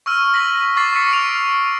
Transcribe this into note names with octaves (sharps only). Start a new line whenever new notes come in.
C#6 E6 F6 D#7
A#6 B6 F#7
C#6 D6 A6 C7
C#6 E6 B6 C#7
F6 D7 F7